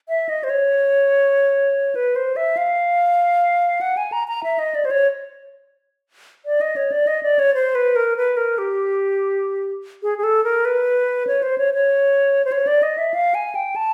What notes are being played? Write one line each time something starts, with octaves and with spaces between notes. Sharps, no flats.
E5
D#5
C5
C#5
B4
C5
E5
F5
F#5
G#5
A#5
A#5
E5
D#5
D5
C5
C#5
D5
D#5
C#5
D5
D#5
D5
C#5
C5
B4
A#4
B4
A#4
G4
G#4
G#4
A4
A#4
B4
C#5
C5
C#5
C#5
C5
C#5
D5
D#5
E5
F5
G#5
G5
A5